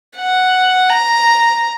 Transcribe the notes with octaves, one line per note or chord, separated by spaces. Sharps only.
F#5
A#5